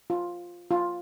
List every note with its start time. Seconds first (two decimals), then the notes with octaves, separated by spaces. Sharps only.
0.10 F4
0.71 F4